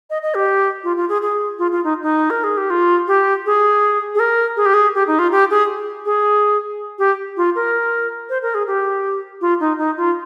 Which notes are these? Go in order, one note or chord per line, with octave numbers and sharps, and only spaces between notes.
D#5
D#5
G4
F4
F4
G#4
G#4
F4
F4
D#4
D#4
A#4
G#4
G4
F4
G4
G#4
G#4
A#4
G#4
G4
G#4
G4
D#4
F4
G4
G#4
G#4
G4
F4
A#4
C5
A#4
G#4
G4
F4
D#4
D#4
F4